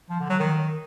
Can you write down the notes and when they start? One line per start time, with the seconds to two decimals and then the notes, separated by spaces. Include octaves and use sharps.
0.10 F3
0.20 D3
0.30 F#3
0.40 D#3